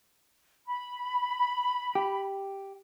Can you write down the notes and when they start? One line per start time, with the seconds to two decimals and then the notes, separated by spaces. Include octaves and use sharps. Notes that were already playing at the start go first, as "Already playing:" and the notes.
0.66 B5
1.95 G4